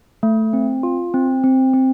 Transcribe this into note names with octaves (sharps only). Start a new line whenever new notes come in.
A3
C4
F4
C4
C4
C4